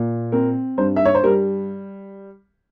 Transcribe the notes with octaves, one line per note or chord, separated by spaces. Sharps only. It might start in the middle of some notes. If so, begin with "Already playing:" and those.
Already playing: A#2
C4 A#4
G2 C5
E5
C#5
C5
G3 A#4